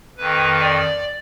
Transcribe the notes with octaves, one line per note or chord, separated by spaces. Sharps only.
F2 D#3 B4
D5